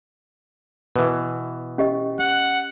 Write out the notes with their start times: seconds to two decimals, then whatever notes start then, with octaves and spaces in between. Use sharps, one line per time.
0.96 B2 E3
1.78 C#4 G4 D#5
2.20 F#5